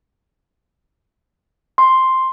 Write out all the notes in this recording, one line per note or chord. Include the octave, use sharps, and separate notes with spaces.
C6